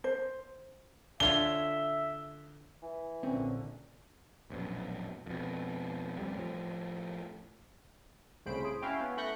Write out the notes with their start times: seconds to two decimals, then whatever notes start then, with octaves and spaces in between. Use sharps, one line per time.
0.04 C5
1.20 D3 F4 C#5 E5 G7
2.82 E3
3.23 A#1 D3 C4 C#4
4.50 A#1 F#2 B2
5.26 F2 B2
6.19 F2 G3
6.35 A2 F3
8.46 C2 A2 C#3 C5 B5 D7
8.64 G#4
8.82 C#4 E4 F#4 F5 G5
9.01 B3 C#4
9.17 A3 B5 C#6 F#6 G6 A#6